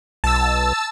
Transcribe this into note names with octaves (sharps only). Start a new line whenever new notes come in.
B1 A5 E6